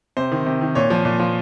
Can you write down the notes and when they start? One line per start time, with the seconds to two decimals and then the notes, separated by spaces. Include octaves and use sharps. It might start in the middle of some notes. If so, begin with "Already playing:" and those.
0.17 C3 C5
0.32 D#3
0.46 C3
0.61 D#3
0.75 A#2 C#5
0.90 F3
1.05 A#2
1.20 F3